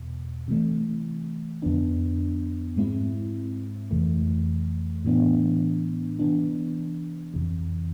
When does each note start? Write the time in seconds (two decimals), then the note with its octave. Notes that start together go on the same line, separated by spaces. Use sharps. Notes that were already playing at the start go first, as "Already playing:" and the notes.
Already playing: E2 B2
0.48 C3 E3 A3
1.62 F2 D3 F3 B3 D4
2.76 G#2 G#3 C4 E4
3.91 F2 C3 E3 A3
5.05 A2 E3 B3 D4
6.19 C3 E3 B3 D4
7.34 F2 C3 E3